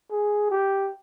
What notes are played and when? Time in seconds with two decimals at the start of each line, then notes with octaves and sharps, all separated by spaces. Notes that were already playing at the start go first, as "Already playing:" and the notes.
0.11 G#4
0.50 G4